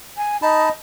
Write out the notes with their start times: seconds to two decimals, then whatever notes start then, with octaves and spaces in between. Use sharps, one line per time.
0.17 G#5
0.42 D#4 D#5 A5 B5